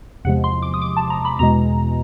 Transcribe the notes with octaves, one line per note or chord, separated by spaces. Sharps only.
E2 C3 F3 G#3 F#5
C6
D6
D#6
D6
A5
A#5
B5
E2 B2 G#3 A#5